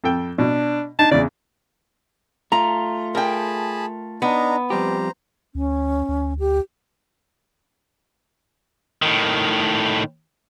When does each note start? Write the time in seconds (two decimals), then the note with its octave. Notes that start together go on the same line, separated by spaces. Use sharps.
0.04 F2 A4 G5
0.39 B2 D4
0.99 D4 D#4 A5
1.11 E2 C#3 D5
2.52 A3 F4 A#5
3.15 G#4 A#4 G5 A5 B5
4.22 B3 D4 D#4 A#5
4.70 F2 G3 G4 C5 A#5
5.55 D2 C#4
6.09 D2
6.40 G4
9.02 A2 D#3